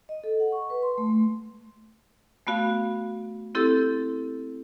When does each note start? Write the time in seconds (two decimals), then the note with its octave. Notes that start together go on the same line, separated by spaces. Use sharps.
0.09 D#5
0.24 A4
0.40 F#5
0.52 C#6
0.70 B4
0.83 C6
0.98 A3
1.10 A3
2.47 A3 B3 F#4 F5
3.55 C4 E4 G4 A4